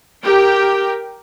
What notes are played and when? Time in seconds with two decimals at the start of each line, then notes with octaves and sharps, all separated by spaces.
0.23 G4 A#4 G5